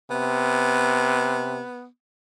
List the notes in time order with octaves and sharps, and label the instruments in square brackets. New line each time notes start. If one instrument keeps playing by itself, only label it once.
[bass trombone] C3 [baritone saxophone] B3